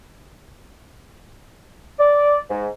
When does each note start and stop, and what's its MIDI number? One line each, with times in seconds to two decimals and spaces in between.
1.99 2.38 74
2.50 2.66 44